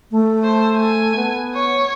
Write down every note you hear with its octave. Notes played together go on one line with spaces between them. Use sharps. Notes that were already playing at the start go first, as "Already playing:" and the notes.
A3
C5
G#5
B3
C#5